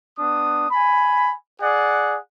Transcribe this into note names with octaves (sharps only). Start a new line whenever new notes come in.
B3 D4 D#6
G#5 B5
G#4 D5 F#5